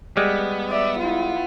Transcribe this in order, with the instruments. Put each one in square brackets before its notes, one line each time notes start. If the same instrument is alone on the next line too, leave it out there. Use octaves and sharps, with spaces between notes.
[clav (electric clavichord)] G3 G#3 [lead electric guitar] B3
[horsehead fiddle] D5 E5
E4 F4